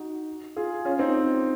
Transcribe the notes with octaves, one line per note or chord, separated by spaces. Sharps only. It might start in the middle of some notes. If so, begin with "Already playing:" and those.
Already playing: D#4 F#4
F4 G#4
C#4 F4
C4 D#4